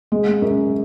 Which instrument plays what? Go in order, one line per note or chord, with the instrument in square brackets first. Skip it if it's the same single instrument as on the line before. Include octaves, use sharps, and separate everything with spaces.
[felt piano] G#3
F#2